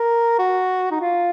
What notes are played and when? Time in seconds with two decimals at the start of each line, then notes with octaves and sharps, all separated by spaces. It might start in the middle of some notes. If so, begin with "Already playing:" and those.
Already playing: A#4
0.39 F#4
0.91 D#4
1.01 F4